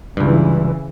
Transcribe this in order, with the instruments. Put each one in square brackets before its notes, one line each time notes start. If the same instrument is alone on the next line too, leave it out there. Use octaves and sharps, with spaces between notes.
[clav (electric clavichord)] C#2 G2 [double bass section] C#3 E3